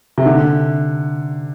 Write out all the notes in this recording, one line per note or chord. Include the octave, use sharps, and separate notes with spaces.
C3
D3